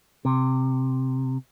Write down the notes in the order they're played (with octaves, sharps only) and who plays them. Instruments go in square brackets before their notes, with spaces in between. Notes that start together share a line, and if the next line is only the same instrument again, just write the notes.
[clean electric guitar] C3